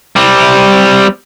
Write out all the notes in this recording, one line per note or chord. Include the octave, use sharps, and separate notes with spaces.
G3 C4